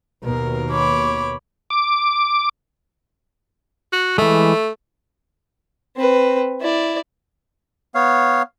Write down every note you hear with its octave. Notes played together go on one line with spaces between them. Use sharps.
D#2 B2 A#4
C#5 B5 D6
D6
F#4
E3 G#3 A3
C4 B4
E4 D5
B3 C#5 F5